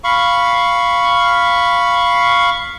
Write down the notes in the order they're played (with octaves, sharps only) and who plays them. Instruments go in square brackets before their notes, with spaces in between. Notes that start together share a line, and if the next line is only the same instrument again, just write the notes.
[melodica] F5 B5 C#6